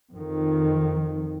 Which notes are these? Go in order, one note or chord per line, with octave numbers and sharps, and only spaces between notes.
F2 D#3